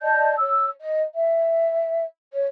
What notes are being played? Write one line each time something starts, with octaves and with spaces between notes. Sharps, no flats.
D5 D#5 A5 G6
C#5 E6
D#5
E5
C#5